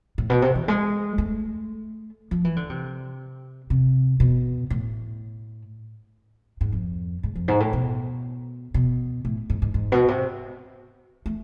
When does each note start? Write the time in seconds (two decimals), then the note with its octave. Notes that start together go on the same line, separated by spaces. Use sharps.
0.18 A2
0.30 B2
0.42 C3
0.55 E3
0.68 G#3
1.18 A3
2.31 F3
2.45 E3
2.56 D3
2.70 C3
3.70 C3
4.20 B2
4.70 A2
6.61 G#2
6.72 F2
7.23 G#2
7.35 F2
7.48 G#2
7.60 A2
7.73 B2
8.74 B2
9.25 A2
9.50 G#2
9.62 G#2
9.74 G#2
9.92 B2
10.08 C3
11.26 A3